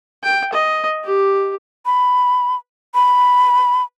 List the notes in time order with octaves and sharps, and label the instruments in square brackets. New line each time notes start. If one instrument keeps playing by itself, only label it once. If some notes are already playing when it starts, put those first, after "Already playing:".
[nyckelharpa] G5
D#5
G4
[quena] B5
B5